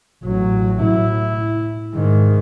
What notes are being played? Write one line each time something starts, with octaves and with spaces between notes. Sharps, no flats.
A1 F#3
A2 E4
G#2 D#3